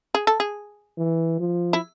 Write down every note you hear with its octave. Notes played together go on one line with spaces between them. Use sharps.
G#4
A4
G#4
E3
F3
E4